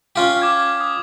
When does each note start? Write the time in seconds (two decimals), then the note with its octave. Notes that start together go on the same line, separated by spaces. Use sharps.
0.16 C#4 F4 G4
0.42 D6 G#6
0.81 D#6